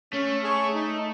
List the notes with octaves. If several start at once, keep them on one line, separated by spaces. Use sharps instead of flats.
A3 C#4
G#4 C#5
D#4